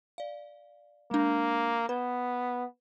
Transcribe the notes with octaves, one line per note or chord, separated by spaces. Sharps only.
D5 F5
G#3 A#3 D4
B3 B4